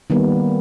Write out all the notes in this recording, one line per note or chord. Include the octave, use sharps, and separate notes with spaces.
D#3 G3 A#3 B3